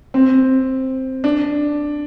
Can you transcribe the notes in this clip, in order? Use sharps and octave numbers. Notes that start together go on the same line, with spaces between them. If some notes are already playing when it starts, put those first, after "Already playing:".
C4
D4